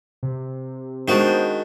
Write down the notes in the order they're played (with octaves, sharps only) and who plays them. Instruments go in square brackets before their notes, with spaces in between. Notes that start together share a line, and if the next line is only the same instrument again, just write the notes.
[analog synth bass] C3
[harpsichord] D#3 F#4 [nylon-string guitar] G#3 D4 [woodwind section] B3 C5